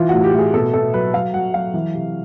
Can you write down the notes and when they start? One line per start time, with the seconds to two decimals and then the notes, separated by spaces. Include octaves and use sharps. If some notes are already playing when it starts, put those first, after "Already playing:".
Already playing: E3 F4
0.09 A2 F#4
0.24 G4
0.34 A2
0.39 G#4
0.54 B2 A4
0.73 B2 A4
0.94 F#3 B4
1.14 F#3 F5
1.34 F#3 F#5
1.54 F#3 F5
1.74 E3
1.94 C3